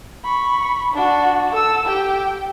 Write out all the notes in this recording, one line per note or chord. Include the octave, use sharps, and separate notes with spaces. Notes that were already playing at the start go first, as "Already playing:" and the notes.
B5 C#6
D4 F#4
A4 E6
G4 G5